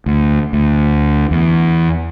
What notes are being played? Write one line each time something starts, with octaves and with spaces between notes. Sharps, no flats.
D2
D2
E2